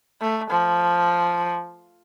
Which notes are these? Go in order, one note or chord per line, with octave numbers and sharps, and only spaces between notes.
A3
F3